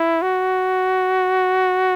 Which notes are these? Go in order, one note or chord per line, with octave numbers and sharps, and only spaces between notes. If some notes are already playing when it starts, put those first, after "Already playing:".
Already playing: E4
F#4